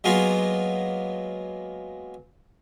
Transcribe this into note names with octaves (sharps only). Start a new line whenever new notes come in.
F#3 G#3 A#3 B3 F4